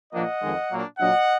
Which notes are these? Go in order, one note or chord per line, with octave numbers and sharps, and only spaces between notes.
A#2 F3 A#3 D4 D#5 F#5
F2 D#3 G#3
A#2 F#3 A#3 D4
A#2 F#3 D4 D#5 F#5